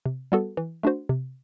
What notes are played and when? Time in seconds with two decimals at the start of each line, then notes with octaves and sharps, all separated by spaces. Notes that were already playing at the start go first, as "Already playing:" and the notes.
0.06 C3
0.32 G3 B3 F#4 A4
0.57 E3
0.83 A3 D4 F#4 C5
1.09 C3